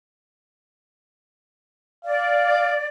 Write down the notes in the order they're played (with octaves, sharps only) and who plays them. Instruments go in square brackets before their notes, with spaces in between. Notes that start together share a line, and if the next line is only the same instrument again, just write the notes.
[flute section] D5 [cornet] F5